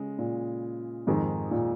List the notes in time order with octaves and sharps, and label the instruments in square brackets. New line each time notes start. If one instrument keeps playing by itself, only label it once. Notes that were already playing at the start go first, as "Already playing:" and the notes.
Already playing: [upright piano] C#3 G#3
[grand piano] A#2
[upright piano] F2 D#3 G#3 [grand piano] G#2
[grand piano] A#2